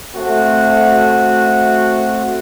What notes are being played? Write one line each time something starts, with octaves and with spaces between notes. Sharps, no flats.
A3 C4 F#4